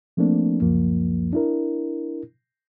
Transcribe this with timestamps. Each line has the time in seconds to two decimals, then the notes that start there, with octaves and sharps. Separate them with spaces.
0.17 F3 A3 A#3 C4 D4
0.62 C#2 F#2 F3 A#3
1.33 D4 E4 A#4